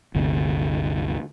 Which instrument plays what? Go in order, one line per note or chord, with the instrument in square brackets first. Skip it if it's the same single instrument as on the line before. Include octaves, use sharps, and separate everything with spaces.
[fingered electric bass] G1 D2 C3